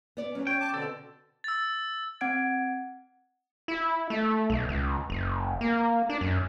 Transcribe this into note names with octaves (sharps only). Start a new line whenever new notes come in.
B3 D5
F#3 C#4
C#5 G5
A5 D6
B2 D3 C4 A4
E6 A6
C4 F#5 G#6 D7
E4
A3
B1
C#2
F#1
A#3
D4
F#2